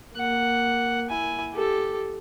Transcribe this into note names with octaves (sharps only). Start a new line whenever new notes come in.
A#3 F#5
E4 G#5
G4 A4